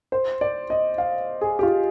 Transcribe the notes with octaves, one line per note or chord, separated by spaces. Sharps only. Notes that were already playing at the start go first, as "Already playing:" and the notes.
C5
D5
D#5
F5
G#4
G4
F4